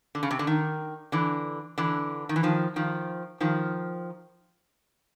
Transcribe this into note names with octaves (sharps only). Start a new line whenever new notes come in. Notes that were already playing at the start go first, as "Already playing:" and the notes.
D3
C#3
C3
D3
D#3
D3 E3
D3 E3
D#3
E3
D#3 F3
D#3 F3
D#3 F3